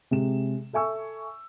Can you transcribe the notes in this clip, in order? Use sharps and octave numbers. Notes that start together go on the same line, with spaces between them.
C3 G#3 E7
A4 E5 G#5 C#6 E6